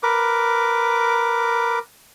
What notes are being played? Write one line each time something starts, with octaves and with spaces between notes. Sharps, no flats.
A#4 B4 D6